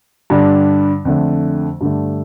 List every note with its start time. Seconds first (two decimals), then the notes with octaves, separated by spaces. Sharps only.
0.30 G2 D3 G3 D4
1.05 F2 D3 A3
1.81 G2 D3 A3